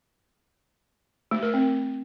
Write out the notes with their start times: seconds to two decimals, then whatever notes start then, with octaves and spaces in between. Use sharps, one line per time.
1.31 A3
1.43 A#4
1.54 C4